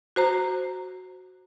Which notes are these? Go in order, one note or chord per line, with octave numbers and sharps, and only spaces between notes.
F#4 C5 A#5